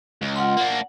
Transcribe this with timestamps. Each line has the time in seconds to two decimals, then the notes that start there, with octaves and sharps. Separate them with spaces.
0.22 C#2
0.36 F4 F#5 C6
0.57 A#3 D4 F#5